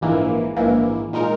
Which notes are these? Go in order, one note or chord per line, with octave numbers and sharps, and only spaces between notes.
A#1 G#2 E3 A#3
A#1 G#2 E3 A#3
A#2 G#3 D#4 A#4